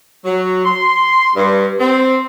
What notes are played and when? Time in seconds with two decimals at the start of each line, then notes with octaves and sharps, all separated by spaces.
0.24 F#3
0.65 C6
1.35 G2
1.80 C4